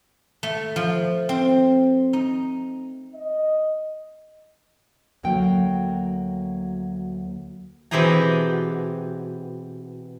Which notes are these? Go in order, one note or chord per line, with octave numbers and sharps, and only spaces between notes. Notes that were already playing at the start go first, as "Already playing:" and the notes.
A3
F3
C4
D#4
D#5
D2 F#3 A#3 G5
B2 E3 C4 G4 G#4 A#5